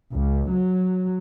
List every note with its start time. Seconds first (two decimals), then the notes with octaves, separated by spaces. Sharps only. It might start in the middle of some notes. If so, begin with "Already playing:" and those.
0.13 C#2
0.52 F#3